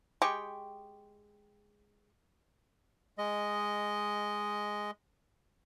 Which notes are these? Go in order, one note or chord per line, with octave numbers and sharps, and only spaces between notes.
G#3 G4 G5 C#6
G#3 D#5